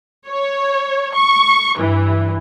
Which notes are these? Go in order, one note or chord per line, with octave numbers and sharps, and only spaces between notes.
C#5
C#6
G2 E3